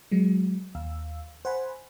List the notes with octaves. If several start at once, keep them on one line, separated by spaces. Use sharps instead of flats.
F#3 G#3
D#2 F5 E6
C5 F#5 G#5 B5